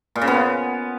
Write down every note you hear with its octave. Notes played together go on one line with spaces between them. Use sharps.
A#2
C#3
B3